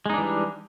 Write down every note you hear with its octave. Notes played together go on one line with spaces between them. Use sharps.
E3 G3 G#3 D4 D#4